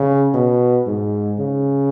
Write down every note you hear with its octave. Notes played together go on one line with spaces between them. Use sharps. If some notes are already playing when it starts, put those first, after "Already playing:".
Already playing: C#3
B2
G#2
C#3